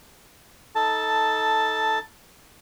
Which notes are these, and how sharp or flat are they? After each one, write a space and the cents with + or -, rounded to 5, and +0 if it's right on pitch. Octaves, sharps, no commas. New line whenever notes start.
D#4 +20 A4 +0 A5 +5